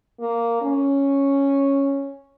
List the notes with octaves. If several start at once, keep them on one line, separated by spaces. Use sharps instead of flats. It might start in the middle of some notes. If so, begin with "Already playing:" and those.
A#3
C#4